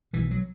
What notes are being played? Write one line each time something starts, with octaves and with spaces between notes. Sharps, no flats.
B1 B2 E3
F#3